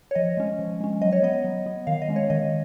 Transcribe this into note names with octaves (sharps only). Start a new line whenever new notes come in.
C#5
F3 D#5
G#3 C#4
F3
G#3 C#4
F#3 D#5
C#5
B3 D#5
F#3
B3
D#3 F5
D#5
G#3 C#4
C#5
D#3 D#5